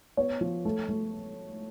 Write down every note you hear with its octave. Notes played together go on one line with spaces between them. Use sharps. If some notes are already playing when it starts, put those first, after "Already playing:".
B3 C#5
F3
A3
A3